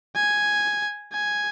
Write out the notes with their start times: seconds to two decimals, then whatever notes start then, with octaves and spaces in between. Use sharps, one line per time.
0.16 G#5
1.13 G#5